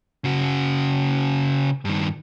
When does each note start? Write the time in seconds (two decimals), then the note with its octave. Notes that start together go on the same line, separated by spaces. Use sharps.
0.24 C#3 F#4
1.85 G2 D#3